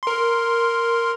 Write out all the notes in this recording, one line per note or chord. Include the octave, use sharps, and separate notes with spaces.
A#4 C6